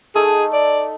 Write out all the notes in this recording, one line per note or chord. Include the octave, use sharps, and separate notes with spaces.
A3 D#4 G#4 A4
D5